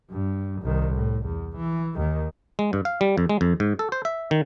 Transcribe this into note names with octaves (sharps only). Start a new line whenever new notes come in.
G2
C2 D#3
A2
E2
E3
D#2 D#3
G#3
G2
F5
G3
F2
G#3
F2
G#2
A4
C5
E5
D#3